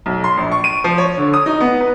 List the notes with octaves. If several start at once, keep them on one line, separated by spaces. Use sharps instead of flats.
B1
C6
A#1
C#6
D#7
F3
C#5
D3
D#6
D#4
B3
B4